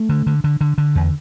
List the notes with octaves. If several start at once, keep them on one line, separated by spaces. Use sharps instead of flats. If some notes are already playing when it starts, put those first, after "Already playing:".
Already playing: A3
D3
D3
D3
D3
D3
E2